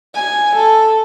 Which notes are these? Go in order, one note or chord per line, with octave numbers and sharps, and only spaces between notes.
G#5
A4